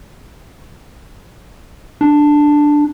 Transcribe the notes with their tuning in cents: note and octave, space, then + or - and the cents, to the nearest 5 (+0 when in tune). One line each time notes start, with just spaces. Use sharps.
D4 +5